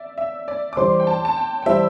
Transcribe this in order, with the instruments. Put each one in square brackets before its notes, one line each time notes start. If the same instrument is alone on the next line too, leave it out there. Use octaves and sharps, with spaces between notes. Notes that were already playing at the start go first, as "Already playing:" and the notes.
Already playing: [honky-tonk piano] D5 E5
E5
D5
D6
[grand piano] E3 G3 E4 C5 [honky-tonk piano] C6
[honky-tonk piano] G5
A5
A5
G5
G5
[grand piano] E3 G3 E4 C5 [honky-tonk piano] E5